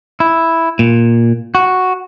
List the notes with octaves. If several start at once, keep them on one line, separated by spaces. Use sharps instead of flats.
E4
A#2
F#4